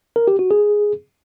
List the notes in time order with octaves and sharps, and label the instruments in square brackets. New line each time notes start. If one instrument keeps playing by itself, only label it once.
[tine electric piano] A#4
G4
F#4
G#4